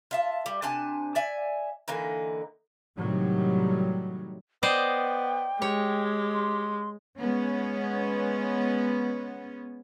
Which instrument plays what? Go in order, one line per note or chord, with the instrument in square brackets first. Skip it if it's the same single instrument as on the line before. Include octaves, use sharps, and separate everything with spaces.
[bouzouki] F4 E5 A5
G3
C3 D4 G#5 A5
D5 E5 G#5
D3 E3 A#3 D#4
[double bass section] A2 C3 D#3 F#3 G3
[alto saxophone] B3 [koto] C5 D5 D#5 [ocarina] G5
[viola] G#3 [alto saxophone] G4 [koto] C#5
[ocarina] C6
[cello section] G#3 B3 C#4